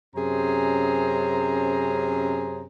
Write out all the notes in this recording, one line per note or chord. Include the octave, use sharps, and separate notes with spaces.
F#2 C3 C#4 G#4 C5 A#5